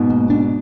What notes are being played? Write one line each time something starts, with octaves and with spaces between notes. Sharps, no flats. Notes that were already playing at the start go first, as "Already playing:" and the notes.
Already playing: G#2 B2
A#3
D4